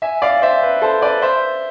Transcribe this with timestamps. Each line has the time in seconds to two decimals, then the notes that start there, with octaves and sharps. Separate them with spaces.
0.02 E5 G#5
0.22 D5 F5
0.42 C5 E5
0.62 B4
0.82 A4 C5
1.02 B4 D5
1.22 C5 E5